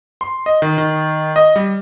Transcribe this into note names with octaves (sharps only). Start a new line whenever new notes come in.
C6
D#5
D#3
D#3
D#5
G3